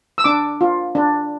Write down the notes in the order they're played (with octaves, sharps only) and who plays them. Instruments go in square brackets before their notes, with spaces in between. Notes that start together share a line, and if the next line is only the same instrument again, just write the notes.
[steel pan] E6
D4 D6
F4
D4